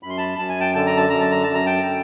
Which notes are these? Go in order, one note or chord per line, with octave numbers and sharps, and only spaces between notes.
F#2 B5
C6
A5 B5
F#2 A5
G#5
G5 A5
D3 A5
A#5
A5
F#2 A#5
A5
A#5
F#2 A5
A#5
G5 A5
D3